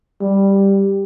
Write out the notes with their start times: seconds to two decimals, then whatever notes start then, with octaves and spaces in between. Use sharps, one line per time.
0.21 G3